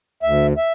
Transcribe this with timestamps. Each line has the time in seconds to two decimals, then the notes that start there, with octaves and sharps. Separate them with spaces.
0.23 D2 E5
0.57 E5